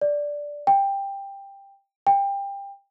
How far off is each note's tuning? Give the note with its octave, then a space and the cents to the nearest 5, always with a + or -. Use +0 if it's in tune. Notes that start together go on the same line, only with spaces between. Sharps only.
D5 -5
G5 +15
G5 +25